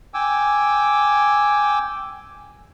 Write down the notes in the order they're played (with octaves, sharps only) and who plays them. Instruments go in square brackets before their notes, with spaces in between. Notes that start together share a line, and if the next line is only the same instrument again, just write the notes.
[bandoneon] G5 G#5 D6 E6